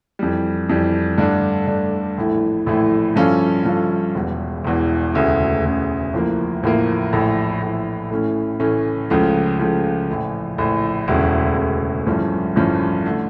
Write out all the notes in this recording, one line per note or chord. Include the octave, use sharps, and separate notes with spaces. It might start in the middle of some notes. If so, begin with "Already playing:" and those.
F2 E3 G3
F2 E3 G3
G2 D3 A3 D4
G2 D3 A3 D4
A#1 A2 E3 A3 E4
A#1 A2 E3 A3 E4
G2 F3 C#4 F4 A4
G2 F3 C#4 F4 A4
E1 E2 E3
E1 E2 E3
E1 D2 C#3
E1 D2 C#3
A1 A2 F3 A#3
A1 A2 F3 A#3
A#1 A2 E3
A#1 A2 E3
A2 E3 A3 C#4
A2 E3 A3 C#4
C#2 C#3 F3 A3
C#2 C#3 F3 A3
A#1 A2 E3
A#1 A2 E3
E1 D2 C#3
E1 D2 C#3
A1 G2 F3 C#4
A1 G2 F3 C#4
D3 A3